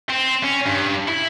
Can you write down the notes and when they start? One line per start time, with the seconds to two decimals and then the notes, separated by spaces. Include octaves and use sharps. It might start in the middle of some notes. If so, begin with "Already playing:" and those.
0.09 C4
0.43 C#4
0.66 G2
1.08 E4